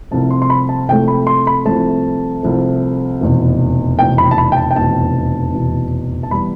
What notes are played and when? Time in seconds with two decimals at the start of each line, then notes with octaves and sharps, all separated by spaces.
0.11 C2 C3 F3 A3 A5
0.31 C6
0.42 C6
0.50 B5
0.69 A5
0.88 C2 C3 F3 A3 G5
1.08 B5
1.27 C6
1.47 B5
1.66 C2 C3 F3 A3 A5
2.43 C2 C3 F3 A3
3.21 F1 E2 B2
3.99 F1 E2 B2 G5
4.18 B5
4.31 A5
4.38 B5
4.52 G5
4.57 A5
4.71 G5
4.76 F1 E2 B2 A5
5.54 F1 E2 B2
6.23 A5
6.31 E3 G3 B3 B5